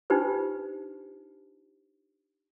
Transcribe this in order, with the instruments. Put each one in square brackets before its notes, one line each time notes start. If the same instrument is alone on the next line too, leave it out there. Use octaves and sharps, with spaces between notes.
[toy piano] D4 D#4 F4 G4 B4 C5